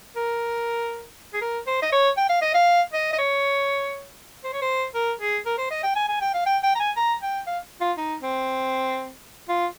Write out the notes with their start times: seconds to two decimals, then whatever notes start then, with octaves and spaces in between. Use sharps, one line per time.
0.16 A#4
1.34 G#4
1.41 A#4
1.67 C5
1.82 D#5
1.92 C#5
2.17 G5
2.29 F5
2.42 D#5
2.54 F5
2.93 D#5
3.13 D#5
3.19 C#5
4.44 C5
4.53 C#5
4.61 C5
4.94 A#4
5.20 G#4
5.46 A#4
5.58 C5
5.71 D#5
5.83 G5
5.96 G#5
6.08 G#5
6.21 G5
6.34 F5
6.46 G5
6.63 G5
6.75 A#5
6.80 G#5
6.96 A#5
7.22 G5
7.47 F5
7.81 F4
7.97 D#4
8.22 C4
9.49 F4